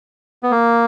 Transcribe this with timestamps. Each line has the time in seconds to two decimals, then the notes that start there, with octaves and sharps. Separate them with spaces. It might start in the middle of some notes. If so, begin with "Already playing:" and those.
0.43 B3
0.51 A#3